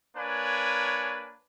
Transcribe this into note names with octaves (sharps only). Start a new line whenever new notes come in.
A#3 D4 B4 C#5 G#5